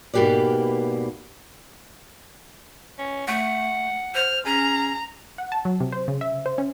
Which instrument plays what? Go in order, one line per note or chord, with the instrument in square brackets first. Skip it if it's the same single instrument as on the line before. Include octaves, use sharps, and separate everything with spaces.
[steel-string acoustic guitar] G#2 B2 A#3 G4 B4 D5
[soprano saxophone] C#4
[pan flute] A3 [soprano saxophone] F#5
[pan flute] C5 [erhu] F6
[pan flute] C#4 [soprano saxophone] G#4 [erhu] A#5
[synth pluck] F#5
A5
F#3
C3
C5
C#3
E5
C5
C#4